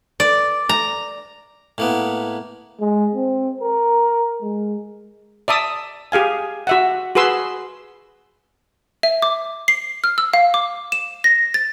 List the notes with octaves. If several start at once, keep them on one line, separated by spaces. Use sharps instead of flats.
D5
A#5
A2 A#3 B3
G#3
C4
A#4
G#3
D5 E5 A5 D#6
G4 G#4 F5 G#5
F#4 E5 F#5
F#4 G#4 B4 C6 E6
E5
D6
C7
F6
E6
F5
D6
E7
A#6
A6